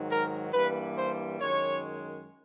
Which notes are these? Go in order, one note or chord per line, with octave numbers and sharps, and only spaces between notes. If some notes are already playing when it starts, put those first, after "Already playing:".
Already playing: G#2 D#3 F#3
A#4
G2 E3 G3 A#3 B4
C5
F#2 D#3 G#3 C#5